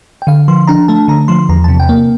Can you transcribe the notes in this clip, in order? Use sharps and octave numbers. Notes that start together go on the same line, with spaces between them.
G5
D3 F5
F3 C6
D4 A#5
A3 A5
D3 A#5
F3 C6
E2 A#5
C3 A5
G5
A#3